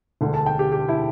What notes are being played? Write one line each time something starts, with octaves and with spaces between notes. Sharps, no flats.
E1 D2 D3
A5
G5
G4
G4
E4